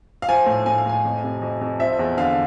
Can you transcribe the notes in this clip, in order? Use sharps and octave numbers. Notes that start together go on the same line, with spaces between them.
F5
F3 G#5
A2
A2 G#5
F5
A2 G#5
F2
C3
F2
F2
F3 E5
E2
D3 F5